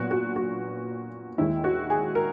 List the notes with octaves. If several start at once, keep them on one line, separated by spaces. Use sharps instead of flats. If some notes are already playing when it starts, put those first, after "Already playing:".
Already playing: A#2 F#3 B3 F#4
F#4
F#4
D#2 D#3 G#3 E4
F#4
G#4
A#4